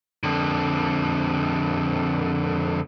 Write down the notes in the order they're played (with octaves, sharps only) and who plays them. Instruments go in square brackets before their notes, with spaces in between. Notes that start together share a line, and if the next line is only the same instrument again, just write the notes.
[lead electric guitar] F2 D3